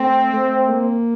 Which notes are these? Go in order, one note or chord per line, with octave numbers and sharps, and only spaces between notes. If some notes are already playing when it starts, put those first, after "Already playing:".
Already playing: A3 C4
A3
A#3